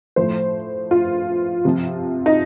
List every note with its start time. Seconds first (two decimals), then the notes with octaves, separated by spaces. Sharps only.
0.16 A2 F3 C5
0.91 F4
1.65 C3 F3
2.26 D#4